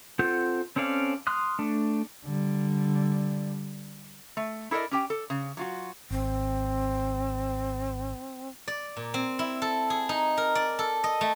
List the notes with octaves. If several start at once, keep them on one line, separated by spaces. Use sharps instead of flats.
C4 F4 A4 F#5 G6
C4 C#4 A4 D5 F5
C6 D#6 F6 F#6
A3 D4
D3 G3
A3
E4 A4 A#4 D5 D#5
C#4 G4 G5
A4
C#3
F#3 F4 F#4
G#1 C4
D5
A#2
C4
E4
A4
G#4
D#4
A#4
D5
A4
D#5
A3